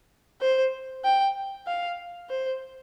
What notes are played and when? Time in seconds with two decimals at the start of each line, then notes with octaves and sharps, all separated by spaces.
0.41 C5
1.04 G5
1.67 F5
2.29 C5